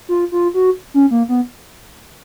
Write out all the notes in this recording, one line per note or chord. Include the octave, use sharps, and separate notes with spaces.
F4
F4
F#4
C#4
A#3
B3